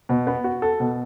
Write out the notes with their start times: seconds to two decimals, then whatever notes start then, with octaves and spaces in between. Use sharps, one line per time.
0.09 B2
0.27 B3
0.44 F#4
0.62 A4
0.80 B2